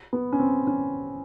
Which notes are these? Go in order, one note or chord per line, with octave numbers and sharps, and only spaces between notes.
B3
C#4
C4
C#4